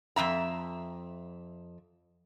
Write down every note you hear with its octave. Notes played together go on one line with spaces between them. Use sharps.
F2 G#2 E5 A#5